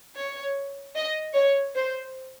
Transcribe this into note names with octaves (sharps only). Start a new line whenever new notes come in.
C#5
D#5
C#5
C5